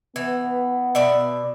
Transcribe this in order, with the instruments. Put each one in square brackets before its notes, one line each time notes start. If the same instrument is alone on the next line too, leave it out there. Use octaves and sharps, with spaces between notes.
[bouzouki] E3 [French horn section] B3
[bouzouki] B2 D5 E5